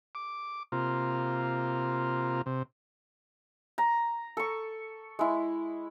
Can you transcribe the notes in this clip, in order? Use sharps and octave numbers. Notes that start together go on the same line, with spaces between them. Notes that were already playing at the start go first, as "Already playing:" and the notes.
D6
C3 A#3 F4
C3
A#5
A4 C#6
G#3 E4